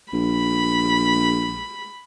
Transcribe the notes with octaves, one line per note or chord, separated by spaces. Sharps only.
A#1 B5